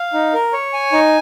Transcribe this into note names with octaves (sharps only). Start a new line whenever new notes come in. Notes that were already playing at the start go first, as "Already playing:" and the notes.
Already playing: F5
D#4
A#4
C#5
G#5
D#4